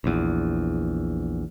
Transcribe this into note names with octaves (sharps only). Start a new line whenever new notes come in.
A#1 E2